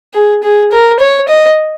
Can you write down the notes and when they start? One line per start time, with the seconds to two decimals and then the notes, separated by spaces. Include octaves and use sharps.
0.14 G#4
0.43 G#4
0.71 A#4
1.00 C#5
1.28 D#5